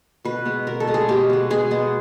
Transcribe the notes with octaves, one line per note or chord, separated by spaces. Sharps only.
B2 B4
G#3 B3
B2 A#4
A4
G#3 B3
G#4
B2 G4
G#3 B3
B2 G#4
G#3 B3